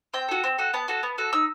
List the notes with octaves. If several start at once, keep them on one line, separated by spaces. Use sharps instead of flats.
C4 G5
F#4 A4
C4
F#4 A4
B3 A5
F#4 A4
B3
F#4 A4
D#4 E6